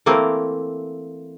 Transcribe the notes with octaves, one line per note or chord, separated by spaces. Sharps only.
E3 A3 A#3 C4 A#4